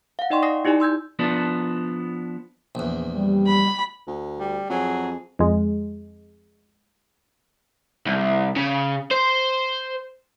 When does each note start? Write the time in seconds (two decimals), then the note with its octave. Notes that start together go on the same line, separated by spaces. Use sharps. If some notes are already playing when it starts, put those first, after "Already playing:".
0.19 F5 F#5
0.30 D#4 D5 D#5 G5 C6 C#6
0.42 D5 G#5 D#6 A#6 C7
0.65 D#4 E4 G4 D5 G#5
0.80 C6 E6 G6 G#6
1.19 F3 B3 D4
2.75 A#1 E2
3.15 G3
3.47 B5
4.07 D2
4.39 G3
4.69 F2 F#3 G#4
5.39 F2 G#3
8.06 C2
8.56 C#3
9.11 C5